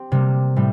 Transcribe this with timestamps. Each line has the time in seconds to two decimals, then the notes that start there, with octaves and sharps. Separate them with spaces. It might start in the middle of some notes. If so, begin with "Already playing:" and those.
Already playing: C4 G4
0.12 C3 G3 A#3
0.56 A2 G3